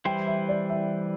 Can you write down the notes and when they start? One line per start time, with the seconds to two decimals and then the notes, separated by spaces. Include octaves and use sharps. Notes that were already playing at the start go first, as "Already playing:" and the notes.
0.05 E3 G3 E4 C5 G5
0.27 E5
0.49 D5
0.70 E5